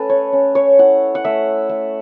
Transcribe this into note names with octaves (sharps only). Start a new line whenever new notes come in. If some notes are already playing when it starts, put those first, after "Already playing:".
Already playing: A3 C#4 A4 B4
C#5
C#4
C#5
E4 F#5
F#5
A3 E5
A3